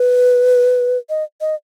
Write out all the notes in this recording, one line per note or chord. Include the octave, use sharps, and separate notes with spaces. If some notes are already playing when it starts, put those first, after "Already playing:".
Already playing: B4
D#5
D#5